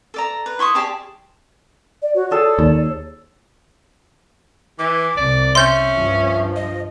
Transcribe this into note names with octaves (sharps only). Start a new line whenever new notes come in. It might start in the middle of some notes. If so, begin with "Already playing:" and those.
A4 D5 A#5
B4
E4 C6 C#6 D#6
G4 G#4 D5 A5
D5
F#4 C#5
G#4 A4 D5
D#2
E3 D6
C2 D5
C#4 E5 C6 G6
G2 F3
D#5